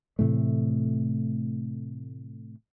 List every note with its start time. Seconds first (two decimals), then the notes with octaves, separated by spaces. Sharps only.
0.19 A2 C3 E3 A3